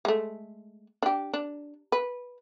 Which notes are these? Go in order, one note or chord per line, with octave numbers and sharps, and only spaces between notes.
G#3 A3
D4 G4
D4
B4